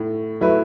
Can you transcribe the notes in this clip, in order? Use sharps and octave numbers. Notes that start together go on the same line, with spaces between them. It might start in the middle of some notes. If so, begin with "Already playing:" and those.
Already playing: A2 A3
F#3 A3 E4 B4